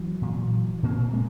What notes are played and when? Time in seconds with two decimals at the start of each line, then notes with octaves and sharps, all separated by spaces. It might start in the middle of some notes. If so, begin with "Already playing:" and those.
Already playing: E3 F#3
0.22 A#2
0.83 A#2 A#3 C4
1.13 G#3 A#3